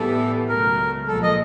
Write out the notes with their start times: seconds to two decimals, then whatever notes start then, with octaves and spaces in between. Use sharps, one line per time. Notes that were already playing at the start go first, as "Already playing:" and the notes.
Already playing: A2 E3 G3 B3 A4
0.49 C#2 B2 F#3 A3 A#4
1.07 A#1 A#2 F3 G#3 A4
1.23 D#5